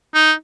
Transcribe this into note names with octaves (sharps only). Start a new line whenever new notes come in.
D#4